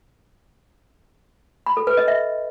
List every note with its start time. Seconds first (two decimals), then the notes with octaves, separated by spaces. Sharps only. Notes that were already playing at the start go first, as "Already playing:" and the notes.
1.66 B5
1.77 A4
1.87 B4
1.97 D#5
2.08 E5